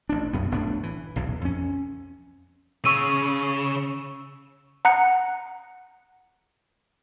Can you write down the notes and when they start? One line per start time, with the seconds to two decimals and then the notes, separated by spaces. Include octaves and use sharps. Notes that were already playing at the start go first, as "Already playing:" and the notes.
0.09 A1 D4
0.33 B1 F#2 B3
0.51 F1 A2 B3 D4
0.83 E3
1.16 B1 E2 A2
1.41 F2 C#4
2.85 C#3 C#6 E6 D#7
4.85 F#5 A#5 F#6 C#7